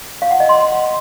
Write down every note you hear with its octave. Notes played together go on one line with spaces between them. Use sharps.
F5
F#5
D#5
C6